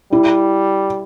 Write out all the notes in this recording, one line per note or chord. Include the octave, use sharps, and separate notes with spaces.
G3 E4